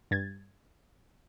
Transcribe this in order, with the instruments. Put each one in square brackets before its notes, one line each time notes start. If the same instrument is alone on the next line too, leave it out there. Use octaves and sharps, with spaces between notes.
[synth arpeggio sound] G2 G#6 A6